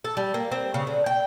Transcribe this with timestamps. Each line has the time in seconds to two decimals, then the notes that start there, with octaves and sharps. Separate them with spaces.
0.04 A4
0.17 G3
0.34 A#3
0.52 C4
0.74 C#3
0.87 D3
1.06 G5